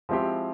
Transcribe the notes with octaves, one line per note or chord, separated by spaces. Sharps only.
F3 G#3 C4 E4 G4